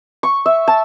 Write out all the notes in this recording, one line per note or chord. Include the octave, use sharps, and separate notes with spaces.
C#6
E5
A5